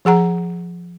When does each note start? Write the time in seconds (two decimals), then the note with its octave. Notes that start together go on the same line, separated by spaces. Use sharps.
0.05 F3 G#4 F#5 A#5